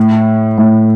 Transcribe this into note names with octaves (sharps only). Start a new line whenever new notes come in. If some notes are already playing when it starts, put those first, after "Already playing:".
Already playing: A2
A2